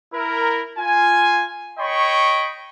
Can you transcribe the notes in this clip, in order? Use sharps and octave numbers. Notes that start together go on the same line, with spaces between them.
E4 A#4
F4 G#5
C#5 D#5 G5 B5 C#6